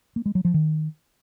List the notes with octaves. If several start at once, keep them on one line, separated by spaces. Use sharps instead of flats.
A#3
G#3
F#3
F3
D#3